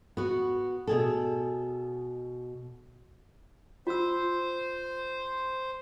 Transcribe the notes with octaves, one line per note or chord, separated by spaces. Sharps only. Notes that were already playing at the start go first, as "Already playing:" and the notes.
B3 F#4
B2 G#4 A4
F4 C5 E6